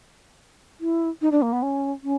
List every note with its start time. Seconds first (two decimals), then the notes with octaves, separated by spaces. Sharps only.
0.80 E4
1.21 D#4
1.32 D4
1.42 A#3
1.52 B3
1.62 C#4
2.03 C#4